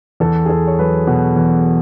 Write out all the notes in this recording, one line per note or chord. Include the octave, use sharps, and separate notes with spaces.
E2 A4
G#4
E2 A4
C#5
F#3 B4
B2
E2